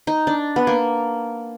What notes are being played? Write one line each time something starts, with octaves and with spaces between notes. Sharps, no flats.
D#4
D4
B3
A#3